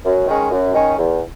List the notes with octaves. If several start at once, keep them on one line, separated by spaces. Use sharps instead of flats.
F#2
D#3 G#3 C#4
F#2
D#3 G#3 C#4
E2